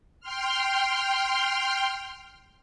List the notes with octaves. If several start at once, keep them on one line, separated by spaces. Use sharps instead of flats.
G5 C6 F6